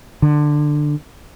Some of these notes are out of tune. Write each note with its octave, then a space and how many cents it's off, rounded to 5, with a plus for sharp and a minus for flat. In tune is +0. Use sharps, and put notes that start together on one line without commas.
D3 +15